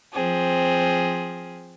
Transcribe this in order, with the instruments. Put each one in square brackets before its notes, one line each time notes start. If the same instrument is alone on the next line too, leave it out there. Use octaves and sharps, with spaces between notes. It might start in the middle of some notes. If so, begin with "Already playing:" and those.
[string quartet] F3 C4 G#4